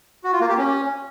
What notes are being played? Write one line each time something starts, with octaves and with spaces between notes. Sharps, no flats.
F#4
F4
A#3
G4
C#4